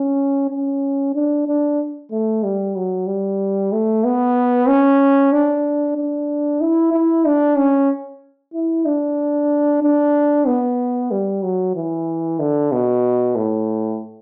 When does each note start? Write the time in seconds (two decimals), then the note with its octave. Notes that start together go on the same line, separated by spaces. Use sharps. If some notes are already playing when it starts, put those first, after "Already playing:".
Already playing: C#4
0.51 C#4
1.15 D4
1.48 D4
2.12 A3
2.44 G3
2.76 F#3
3.07 G3
3.73 A3
4.05 B3
4.68 C#4
5.32 D4
5.97 D4
6.61 E4
6.93 E4
7.26 D4
7.57 C#4
8.54 E4
8.86 D4
9.82 D4
10.47 B3
11.11 G3
11.43 F#3
11.75 E3
12.40 D3
12.72 B2
13.36 A2